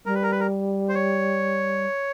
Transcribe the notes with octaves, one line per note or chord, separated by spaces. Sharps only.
G3 A#4
B4
A#4
B4
A#4
C5
C#5